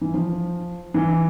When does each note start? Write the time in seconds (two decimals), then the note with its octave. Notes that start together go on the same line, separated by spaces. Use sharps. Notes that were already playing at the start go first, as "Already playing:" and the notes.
0.01 E3
0.14 F3
0.94 E3